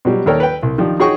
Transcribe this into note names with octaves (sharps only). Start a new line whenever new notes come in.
B2 F#3 G3
D#2 A4 A#4 C#5 D5 G5
B4 G5
C2
D#3 F3 D4 G4
D#4 F#4 G#4 C#5 G5 C#6